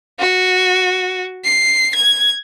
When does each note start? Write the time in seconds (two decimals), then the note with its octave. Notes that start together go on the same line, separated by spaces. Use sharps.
0.19 F#4
1.44 C7
1.95 G#6